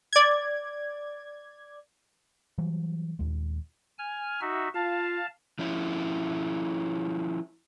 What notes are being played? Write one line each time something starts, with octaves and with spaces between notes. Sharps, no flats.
D5 G#6
E3 F#3 G3
D#1 G#1 D#2 G#3
G#5 F6
D#4 F#4 E5
F4 F5 A5
F3 C#4 E4